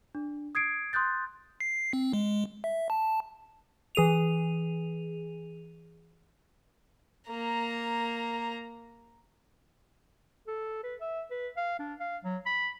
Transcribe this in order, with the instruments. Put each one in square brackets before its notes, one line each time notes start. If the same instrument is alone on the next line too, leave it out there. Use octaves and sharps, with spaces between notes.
[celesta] D4
D#6 G#6 C7 D7
C6 D#6 F#6 G6 A6
[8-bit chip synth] C7
C4
G#3
E5
A5
[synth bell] E3 G#4 D#7 F7
[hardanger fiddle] A#3 A#5
[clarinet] A4
B4
E5
B4
F5
D4
F5
F#3
B5